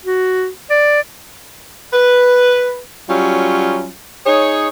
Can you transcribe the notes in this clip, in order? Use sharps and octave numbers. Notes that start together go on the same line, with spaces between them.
F#4
D5
B4
F#3 G3 C#4 F4
D#4 G#4 C#5